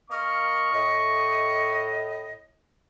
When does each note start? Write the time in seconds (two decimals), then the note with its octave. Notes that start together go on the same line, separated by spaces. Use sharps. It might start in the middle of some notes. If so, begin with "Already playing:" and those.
0.10 A#3 D#5 C#6 F6
0.73 A2 D#5